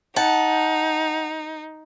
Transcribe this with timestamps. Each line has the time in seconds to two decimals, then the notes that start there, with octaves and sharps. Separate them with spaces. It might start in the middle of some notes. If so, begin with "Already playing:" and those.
0.16 D#4 F#5 G5 A5